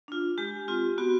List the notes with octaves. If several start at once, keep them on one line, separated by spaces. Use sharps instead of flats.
D4 F4
G#3 G4
C4 F4
B3 F#4